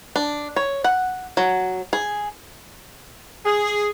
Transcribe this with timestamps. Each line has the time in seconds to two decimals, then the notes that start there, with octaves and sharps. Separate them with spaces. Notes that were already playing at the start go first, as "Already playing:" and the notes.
0.16 D4
0.56 C#5
0.84 F#5
1.37 F#3
1.93 G#4
3.45 G#4